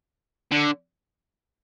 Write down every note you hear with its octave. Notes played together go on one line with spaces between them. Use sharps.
D3